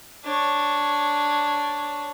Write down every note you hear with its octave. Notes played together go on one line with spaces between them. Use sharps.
D4 C#5